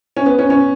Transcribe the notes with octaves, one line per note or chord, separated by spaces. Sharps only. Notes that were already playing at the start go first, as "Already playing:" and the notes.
C#4
B3
C#4
C#4